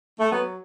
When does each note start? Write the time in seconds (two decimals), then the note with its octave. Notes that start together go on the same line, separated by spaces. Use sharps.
0.19 A3
0.31 F#3 B3